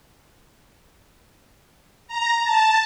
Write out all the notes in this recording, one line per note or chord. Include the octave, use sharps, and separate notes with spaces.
A#5
A5